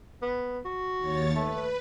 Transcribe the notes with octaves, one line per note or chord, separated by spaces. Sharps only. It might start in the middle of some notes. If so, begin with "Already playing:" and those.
B3
F#4
D#2 C#5 A6
A3 B4